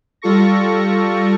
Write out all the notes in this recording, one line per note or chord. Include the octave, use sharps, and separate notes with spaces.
G3 F4 A4 C#6 A#6